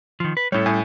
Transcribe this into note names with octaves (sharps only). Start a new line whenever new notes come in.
D#3 F3
B4
A2 G3 C#4 A4 C#5
A2 G#5